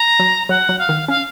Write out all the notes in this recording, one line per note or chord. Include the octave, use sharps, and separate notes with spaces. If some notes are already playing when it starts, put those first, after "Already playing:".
Already playing: A#5
F#3
F#3 F#5
F#3
F5
D#3
C#4 F5